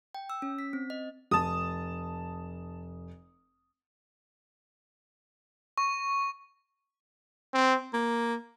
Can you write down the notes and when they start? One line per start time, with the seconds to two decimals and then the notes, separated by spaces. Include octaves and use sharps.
0.15 G5
0.30 E6
0.42 C#4
0.59 B6
0.73 C4
0.90 D#5
1.31 F1 A5 D#6
5.78 C#6
7.54 C4
7.94 A#3